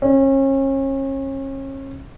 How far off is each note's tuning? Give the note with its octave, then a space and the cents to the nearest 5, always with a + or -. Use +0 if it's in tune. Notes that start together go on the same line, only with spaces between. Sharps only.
C#4 -35